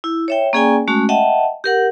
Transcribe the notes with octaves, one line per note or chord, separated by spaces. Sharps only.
E4
C#5 E5 G5
A#3 C#4 G#4 D5 G5 G#5
G#3 A3 C#4 F#4
D#5 E5 F#5 G5 A5
G4 A#4 F#5